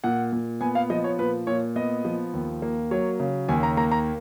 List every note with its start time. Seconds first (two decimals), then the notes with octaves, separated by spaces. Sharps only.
0.04 A#2 F#5
0.32 A#2
0.61 B3 G#5
0.75 F5
0.90 F3 D#5
1.04 C#5
1.18 A#2 B4
1.47 A#2 C#5
1.76 B3 D#5
2.05 F3
2.33 D#2
2.62 A#3
2.91 F#3 C#5
3.20 C#3
3.48 D#2 G#5
3.63 A#5
3.77 A#3 A#5
3.91 A#5